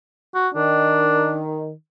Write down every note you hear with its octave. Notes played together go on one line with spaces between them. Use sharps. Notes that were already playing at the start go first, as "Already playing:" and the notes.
F#4
D#3 D4